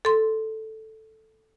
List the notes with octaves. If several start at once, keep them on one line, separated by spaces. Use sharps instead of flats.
A4 C6